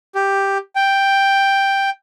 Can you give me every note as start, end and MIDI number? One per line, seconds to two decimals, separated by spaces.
0.15 0.58 67
0.76 1.90 79